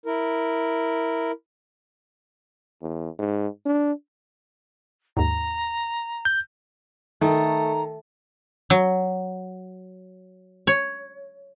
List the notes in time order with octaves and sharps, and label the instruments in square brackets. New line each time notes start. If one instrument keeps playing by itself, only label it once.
[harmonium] E4 A#4
[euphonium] E2
G#2
D4
[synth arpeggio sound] D#2 G#2 [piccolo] A#5
[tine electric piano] G6
[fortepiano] D#3 [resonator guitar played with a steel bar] A3 [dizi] A#5
[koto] F#3
C#5